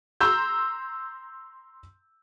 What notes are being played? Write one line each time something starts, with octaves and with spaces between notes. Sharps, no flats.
A#5 C6 E6 G6